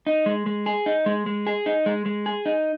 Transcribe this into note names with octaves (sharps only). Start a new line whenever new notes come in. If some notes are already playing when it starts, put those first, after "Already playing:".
D#4
G#3
G#3
G#4
D#4
G#3
G#3
G#4
D#4
G#3
G#3
G#4
D#4